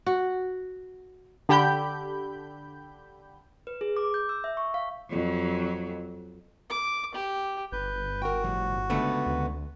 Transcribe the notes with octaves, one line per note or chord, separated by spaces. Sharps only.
F#4
D3 G4 B5 G6
B4
G#4
D6
G6
E6
E5
C#6
F5
F2 F#3
D6
G4
G1 B4 G6
F#4 A#4 G5
A2 F3 G3
C#2 D3 A3 B3 D4
D2